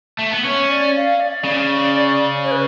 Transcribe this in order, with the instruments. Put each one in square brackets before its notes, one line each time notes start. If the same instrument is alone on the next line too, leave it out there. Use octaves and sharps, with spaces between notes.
[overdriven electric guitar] A3
B3
[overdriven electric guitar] C#4 [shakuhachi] C#5
[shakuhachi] D5
F5
D5
[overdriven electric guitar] C#3
[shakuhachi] C#5
B4